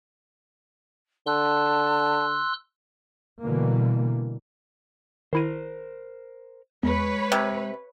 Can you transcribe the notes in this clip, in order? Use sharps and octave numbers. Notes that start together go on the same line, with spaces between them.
D3 A5 C6 E6 F#6
B2 D3 E3 G3 A#3
D#3 E4 A#4 C5 D#7
E2 G#3 B4 C#5
C3 F#6 G#6